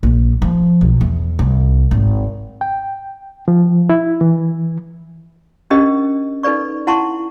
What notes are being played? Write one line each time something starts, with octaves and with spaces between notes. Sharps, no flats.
A#1
F3
B1
E2
C2
G#1
G5
F3
E4
E3
C#4 D4 G4 A#4 D#5
D#4 A4 B4 D5 C#6
E4 F#5 A5 A#5 C6 C#6